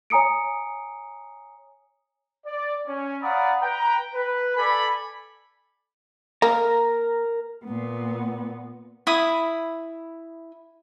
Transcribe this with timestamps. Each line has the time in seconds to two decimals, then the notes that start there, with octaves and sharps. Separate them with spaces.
0.10 C#5 G#5 A#5 D#6 C#7 D7
2.46 D5
2.87 C#4 G#5
3.22 D5 F5 F#5 A#5 B5 D#6
3.62 B4 G5 A#5
4.14 B4
4.56 A4 D5 G#5 B5
6.42 A#3 A#4 A#5
7.66 A#2 B3
9.07 E4 B5 D#6